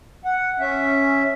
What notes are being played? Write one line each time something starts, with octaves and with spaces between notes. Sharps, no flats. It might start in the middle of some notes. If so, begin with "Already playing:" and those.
F#5
C#4 E5